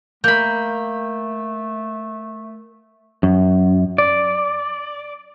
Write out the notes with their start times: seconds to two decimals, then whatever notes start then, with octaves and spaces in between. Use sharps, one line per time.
0.24 A3 A#3 B5 G6
3.23 F#2
3.98 D5